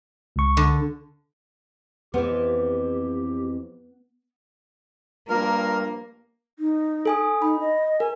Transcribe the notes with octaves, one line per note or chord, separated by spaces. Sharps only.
C#2 C#6
D3
F2 E3 B3 G4
G2 F3 A#3 F4 A#4
D#4
A4 G#5 D#6
D#4 B5
D#5
A#4 G#5